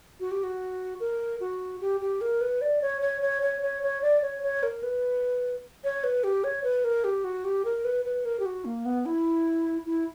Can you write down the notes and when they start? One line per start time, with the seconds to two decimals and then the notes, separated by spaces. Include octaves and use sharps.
0.20 F#4
0.31 G4
0.43 F#4
1.00 A#4
1.40 F#4
1.81 G4
2.01 G4
2.21 A#4
2.41 B4
2.61 D5
2.82 C#5
3.02 C#5
3.21 C#5
3.42 C#5
3.62 C#5
3.83 C#5
4.02 D5
4.22 C#5
4.43 C#5
4.63 A#4
4.83 B4
5.84 C#5
6.04 B4
6.24 G4
6.44 C#5
6.64 B4
6.84 A#4
7.04 G4
7.24 F#4
7.44 G4
7.65 A#4
7.85 B4
8.05 B4
8.25 A#4
8.40 G4
8.46 F#4
8.65 A#3
8.85 B3
9.06 E4
9.86 E4